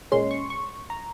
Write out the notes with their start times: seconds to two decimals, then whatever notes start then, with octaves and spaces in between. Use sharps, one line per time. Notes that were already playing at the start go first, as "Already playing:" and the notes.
0.12 A#2 G#3 C#4 C6
0.31 C#6
0.50 C#6
0.90 A#5